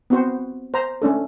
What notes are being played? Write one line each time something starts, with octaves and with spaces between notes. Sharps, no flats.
B3 C4 F#4 C5
C5 A#5
A3 C#4 D4 A4